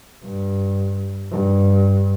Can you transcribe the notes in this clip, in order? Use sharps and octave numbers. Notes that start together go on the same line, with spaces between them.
G2
G2